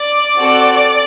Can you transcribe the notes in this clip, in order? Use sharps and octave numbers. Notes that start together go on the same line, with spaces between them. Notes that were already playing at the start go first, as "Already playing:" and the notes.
Already playing: D5
C4 F#4 A4